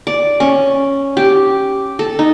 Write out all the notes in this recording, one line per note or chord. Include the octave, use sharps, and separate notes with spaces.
D5
C#4
G4
A4
D#4